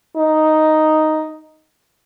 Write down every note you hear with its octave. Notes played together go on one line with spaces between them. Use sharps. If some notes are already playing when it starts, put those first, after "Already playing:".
D#4